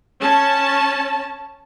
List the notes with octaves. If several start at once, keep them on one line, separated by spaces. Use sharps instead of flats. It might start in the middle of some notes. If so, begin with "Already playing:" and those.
C#4 A5